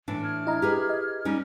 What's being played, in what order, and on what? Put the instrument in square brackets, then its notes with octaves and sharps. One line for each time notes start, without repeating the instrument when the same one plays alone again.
[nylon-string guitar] A2 E3 D4
[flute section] F6 G#6
[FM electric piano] E4 D#5 A#5
[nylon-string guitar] G4 G#4 B4
[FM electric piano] D#5
[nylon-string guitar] G3 C#4 D#4